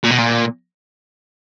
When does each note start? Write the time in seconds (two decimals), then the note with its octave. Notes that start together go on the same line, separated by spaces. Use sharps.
0.04 A#2
0.11 B2
0.18 A#2